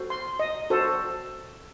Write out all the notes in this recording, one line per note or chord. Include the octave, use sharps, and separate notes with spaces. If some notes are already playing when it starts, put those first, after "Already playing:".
Already playing: F#4 A4 C5
C6
D#5
F#4 A4 C5